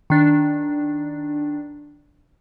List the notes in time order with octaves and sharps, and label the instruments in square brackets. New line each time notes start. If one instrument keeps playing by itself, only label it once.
[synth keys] D#3 D4